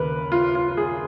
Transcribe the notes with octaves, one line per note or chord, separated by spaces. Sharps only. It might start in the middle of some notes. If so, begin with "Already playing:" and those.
Already playing: D#2 C#3 A#4 B4
F4
F4
G#4